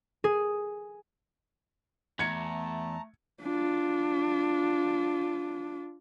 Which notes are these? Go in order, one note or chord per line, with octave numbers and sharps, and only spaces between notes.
G#4
E2 A3 A5 A#5 G#6 C#7
D4 F4